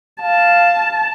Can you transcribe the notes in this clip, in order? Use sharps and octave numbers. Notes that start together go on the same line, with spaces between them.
F5 A5